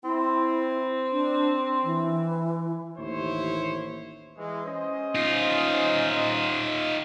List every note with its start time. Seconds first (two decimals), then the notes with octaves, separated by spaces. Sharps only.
0.04 C4 E4
1.12 D4
1.84 E3
2.98 A1 D#2 E4 C5 C#5
4.36 E3 G#3
4.65 C#4 C5 D#5
5.15 D#4 F4